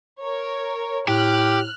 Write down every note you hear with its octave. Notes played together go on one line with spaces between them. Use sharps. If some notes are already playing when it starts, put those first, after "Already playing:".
A#4 C#5
A2 G4 F6 F#6